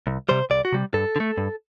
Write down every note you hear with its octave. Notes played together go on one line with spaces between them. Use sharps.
C2
C3 G3 C5
C2 D5
F#4
C3 G3
G2 A4
D3
A3
G2